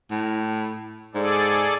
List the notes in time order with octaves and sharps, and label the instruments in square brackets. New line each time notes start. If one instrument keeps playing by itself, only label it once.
[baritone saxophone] A2
[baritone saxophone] G#2 [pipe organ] G#4 A4 D5